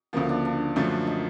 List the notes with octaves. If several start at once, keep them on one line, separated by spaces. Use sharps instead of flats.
D2 C#3 F3 A#3
D4
D4
F#2 D3 F3 A3
D#4